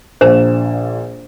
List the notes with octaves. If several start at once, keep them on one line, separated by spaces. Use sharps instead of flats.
A#1 A#2 C5 E7